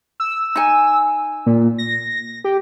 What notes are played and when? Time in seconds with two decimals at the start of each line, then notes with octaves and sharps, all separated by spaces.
0.20 E6
0.55 D#4 G#5
1.46 A#2
1.78 A#6
2.44 G4